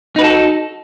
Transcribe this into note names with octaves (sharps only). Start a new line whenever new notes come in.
D#4 F#4 A4 B4